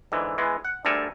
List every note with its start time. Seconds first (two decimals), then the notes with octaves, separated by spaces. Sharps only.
0.12 G#2 D3 E3
0.38 E3 G#3 B3
0.65 F#5
0.85 D2 D3 G3 A4 A#4 G#5